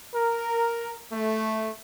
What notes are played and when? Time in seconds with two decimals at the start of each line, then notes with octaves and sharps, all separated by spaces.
0.15 A#4
1.12 A3